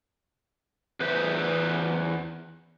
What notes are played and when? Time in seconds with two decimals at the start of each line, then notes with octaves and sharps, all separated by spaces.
1.00 E2 B4 C5 E5